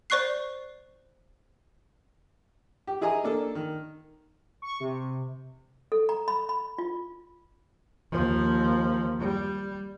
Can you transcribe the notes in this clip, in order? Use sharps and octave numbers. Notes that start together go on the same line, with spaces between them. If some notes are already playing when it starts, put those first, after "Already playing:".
C5 D5 C#6 F#6 C7
G4
E4 G#4 D#5 G#5 A#5
A#3 D4 A4
D#3
C#6
C3
A4
A#5
B5
B5
F4
D#2 F3
G3